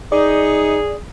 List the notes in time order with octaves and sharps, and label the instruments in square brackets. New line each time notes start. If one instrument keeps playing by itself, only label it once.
[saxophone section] D#4 [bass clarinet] G#4 [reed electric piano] D5